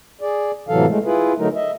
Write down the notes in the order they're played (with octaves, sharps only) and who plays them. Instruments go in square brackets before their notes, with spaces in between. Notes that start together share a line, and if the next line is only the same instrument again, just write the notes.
[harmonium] G#4 D5
A2 C3 E3 F#3 A4 F5
G#3 A3
E4 F4 G#4 B4
D3 F#3 A3 D#4 A#4
D#5 E5